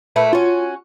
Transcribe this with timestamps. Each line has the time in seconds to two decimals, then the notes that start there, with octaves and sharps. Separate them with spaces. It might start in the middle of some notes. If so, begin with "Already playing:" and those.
0.16 A#2 A3 B4
0.33 C#4 F4 F#4